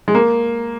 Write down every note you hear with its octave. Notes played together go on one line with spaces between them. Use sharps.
G#3
A#3